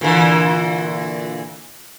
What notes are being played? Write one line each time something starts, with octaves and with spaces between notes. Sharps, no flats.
A#2 D3 E3